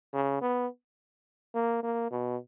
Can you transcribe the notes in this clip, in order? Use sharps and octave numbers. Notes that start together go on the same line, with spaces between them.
C#3
B3
A#3
A#3
B2